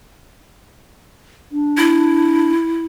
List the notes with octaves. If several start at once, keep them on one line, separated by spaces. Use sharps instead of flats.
D4
E4